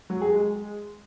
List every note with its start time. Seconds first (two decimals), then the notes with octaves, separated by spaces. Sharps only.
0.10 F#3
0.21 G#4
0.33 G#3